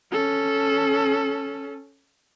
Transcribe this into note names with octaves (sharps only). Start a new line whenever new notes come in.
C#4 A4